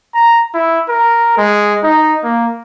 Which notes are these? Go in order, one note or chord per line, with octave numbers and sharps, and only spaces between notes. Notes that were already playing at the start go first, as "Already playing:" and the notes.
A#5
E4
A#4
G#3
D#4
A#3